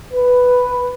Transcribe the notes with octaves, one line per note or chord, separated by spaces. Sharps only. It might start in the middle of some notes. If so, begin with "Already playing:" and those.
B4